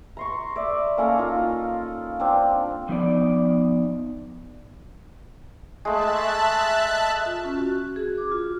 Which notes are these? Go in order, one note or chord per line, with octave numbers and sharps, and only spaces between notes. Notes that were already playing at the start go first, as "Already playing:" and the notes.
A#5 C6 C#6
D5 E5
A#3 C#4 A4 A#5
D#4 F4
C4 D4
F3 B3 D#4 C5 D5
G#3 A3 E5 A5 F#6
F4
C#4
F#4
G#4
D6
F4